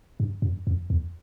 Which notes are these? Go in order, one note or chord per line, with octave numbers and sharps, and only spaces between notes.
G2
F#2
F2
E2